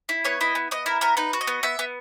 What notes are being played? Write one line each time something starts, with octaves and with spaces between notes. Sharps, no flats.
E4
B3 C#5
E4 D#5
B3
B3 D#5
E4 A#4
B3 A#4
D#4 B4
F#4
D#5
B3
B3 E5
B3